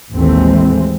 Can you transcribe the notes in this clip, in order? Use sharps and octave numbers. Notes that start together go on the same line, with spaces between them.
A1 D#2 E3 G#3 A3 C4